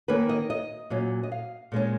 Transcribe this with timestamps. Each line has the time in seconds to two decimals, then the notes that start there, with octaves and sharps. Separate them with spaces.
0.08 D#3 A#3 C#4 B4
0.29 D#5
0.50 D#5
0.90 A#2 F#3 C#4
1.23 D#5
1.32 F5
1.72 A#2 G#3 C#4